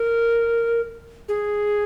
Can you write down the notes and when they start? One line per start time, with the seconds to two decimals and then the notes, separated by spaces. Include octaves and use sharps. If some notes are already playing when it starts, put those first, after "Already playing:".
Already playing: A#4
1.29 G#4